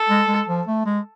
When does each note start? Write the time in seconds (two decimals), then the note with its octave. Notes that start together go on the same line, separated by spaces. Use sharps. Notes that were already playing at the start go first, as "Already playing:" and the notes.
Already playing: A4
0.09 G#3
0.28 G#3
0.48 F3
0.67 A3
0.86 G#3